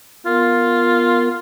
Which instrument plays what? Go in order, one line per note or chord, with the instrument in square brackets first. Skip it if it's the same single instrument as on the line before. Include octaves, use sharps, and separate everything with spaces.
[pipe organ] B3 A#4 [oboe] F4